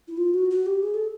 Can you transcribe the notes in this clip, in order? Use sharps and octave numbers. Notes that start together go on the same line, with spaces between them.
E4
F4
F#4
F#4
G4
G#4
A4